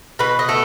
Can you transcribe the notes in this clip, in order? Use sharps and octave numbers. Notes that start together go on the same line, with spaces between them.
B2 B4
D#5
A3